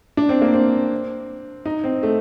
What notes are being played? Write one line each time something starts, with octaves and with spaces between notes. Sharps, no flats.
D4
C4
A#3
C4
D#4
C4
A3